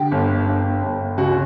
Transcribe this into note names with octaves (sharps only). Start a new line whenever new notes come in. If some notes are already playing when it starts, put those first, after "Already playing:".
Already playing: D3 G4
G1
G1
G1
C#2 F#4